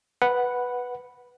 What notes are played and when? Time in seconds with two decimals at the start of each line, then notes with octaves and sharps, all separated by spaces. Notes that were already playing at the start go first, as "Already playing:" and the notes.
0.22 B4 F#5